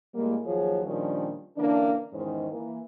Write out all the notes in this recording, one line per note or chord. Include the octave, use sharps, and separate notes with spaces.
A2 G3 G#3 A#3
D#2 F3 F#3 F4 G#4 C#5
A#2 D#3 F3 G3 C#4 D4
D3 E3 A#3 C#4 D4
E2 G#2 D#3 E3 C#4 C5
E3 A#3